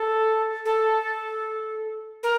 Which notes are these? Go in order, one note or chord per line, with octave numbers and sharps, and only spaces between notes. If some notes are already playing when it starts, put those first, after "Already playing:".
Already playing: A4
A4
A#4